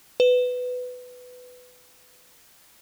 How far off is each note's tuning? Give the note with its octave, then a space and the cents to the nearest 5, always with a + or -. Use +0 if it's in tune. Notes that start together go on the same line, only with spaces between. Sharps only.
B4 +15